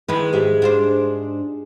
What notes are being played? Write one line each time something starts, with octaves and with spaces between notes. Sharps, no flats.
D#3 F3 G#3 E4 B4
G#2 G4 E5
D4 F4 C5